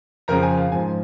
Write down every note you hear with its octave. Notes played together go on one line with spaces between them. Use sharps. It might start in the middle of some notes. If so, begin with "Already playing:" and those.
F2 C#3 F3 A#4 A#5
G#5
F5
G#2 F3 G#5